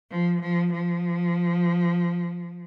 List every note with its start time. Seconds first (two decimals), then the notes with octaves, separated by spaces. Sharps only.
0.10 F3
0.41 F3
0.72 F3